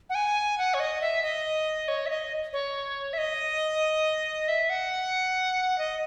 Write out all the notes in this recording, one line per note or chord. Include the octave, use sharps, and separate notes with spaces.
F#5
G#5
F#5
C#5
D#5
E5
D#5
C#5
E5
D#5
C#5
E5
D#5
E5
F#5
D#5